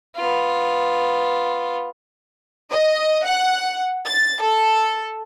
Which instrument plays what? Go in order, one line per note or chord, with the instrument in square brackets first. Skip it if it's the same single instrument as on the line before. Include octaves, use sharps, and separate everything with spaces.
[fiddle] B3 F4
[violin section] D#5
F#5
A6
A4